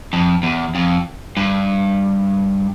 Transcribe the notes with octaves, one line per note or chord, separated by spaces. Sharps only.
F2
E2
F2
G2